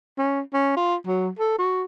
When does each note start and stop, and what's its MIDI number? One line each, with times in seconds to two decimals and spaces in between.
0.18 0.40 61
0.53 0.73 61
0.76 0.95 65
1.07 1.29 54
1.39 1.55 69
1.58 1.84 66